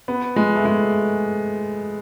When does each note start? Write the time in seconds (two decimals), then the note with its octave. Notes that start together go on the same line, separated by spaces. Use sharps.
0.08 B3
0.36 G#3
0.56 A3
0.65 G#3